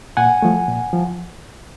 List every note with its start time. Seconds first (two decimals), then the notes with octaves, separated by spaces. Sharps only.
0.17 A#2 F#5 G#5
0.42 F3 A3
0.68 A#2
0.93 F3